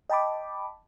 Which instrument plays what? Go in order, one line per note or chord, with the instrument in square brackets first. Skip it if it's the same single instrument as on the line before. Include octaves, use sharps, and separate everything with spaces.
[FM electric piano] D#5 G5 A5 B5 D6